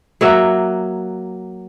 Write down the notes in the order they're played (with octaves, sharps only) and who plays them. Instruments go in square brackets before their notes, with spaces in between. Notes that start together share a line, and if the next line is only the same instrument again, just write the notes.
[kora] F#3 A#3 F#4 E5